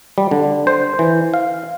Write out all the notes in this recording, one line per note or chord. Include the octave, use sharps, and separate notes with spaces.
G3
D3
C5
E3
F5